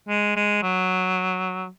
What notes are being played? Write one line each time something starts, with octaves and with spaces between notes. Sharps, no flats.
G#3
G#3
F#3